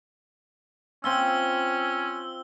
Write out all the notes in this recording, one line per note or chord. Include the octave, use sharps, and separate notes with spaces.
C4 C#4 F4 E6 G7